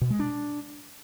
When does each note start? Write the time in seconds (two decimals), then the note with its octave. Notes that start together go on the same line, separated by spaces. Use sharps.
0.01 B2
0.10 G#3
0.19 D4